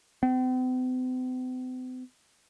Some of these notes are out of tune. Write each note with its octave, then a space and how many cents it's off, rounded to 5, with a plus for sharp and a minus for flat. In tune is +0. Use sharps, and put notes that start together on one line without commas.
C4 -45